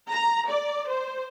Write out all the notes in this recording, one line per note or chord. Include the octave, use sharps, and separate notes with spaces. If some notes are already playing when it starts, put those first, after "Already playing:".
A#5
D5
C5